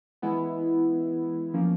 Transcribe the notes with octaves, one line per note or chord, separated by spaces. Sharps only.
E3 G#3 B3 E4
F3 A#3 C#4